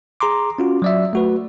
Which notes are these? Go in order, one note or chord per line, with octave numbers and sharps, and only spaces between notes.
G#4 A#5 C6 D6
C#4 F4 F#4
F#3 D5 E5
A3 F#4 B4